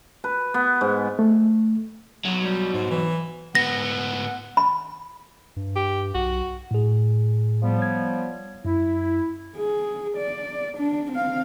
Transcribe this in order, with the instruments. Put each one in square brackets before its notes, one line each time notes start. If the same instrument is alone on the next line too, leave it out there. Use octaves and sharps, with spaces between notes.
[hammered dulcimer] B4
B3
G#2
[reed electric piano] A3
[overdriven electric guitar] B1 F#3
[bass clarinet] G3
G#2
E3
[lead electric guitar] G#2 B3 [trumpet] F#5 [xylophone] A#6
[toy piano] B5
[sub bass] G2
[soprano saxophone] G4
[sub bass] B1 [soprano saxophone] F#4
[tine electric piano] A2 G#4
[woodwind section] F3 G3 B3
[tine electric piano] C#5 G#6
[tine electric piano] F#2 [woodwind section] E4
[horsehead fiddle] G#4
D5
D4
C4 F5